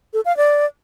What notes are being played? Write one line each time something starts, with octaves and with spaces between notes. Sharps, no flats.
A4
F5
D5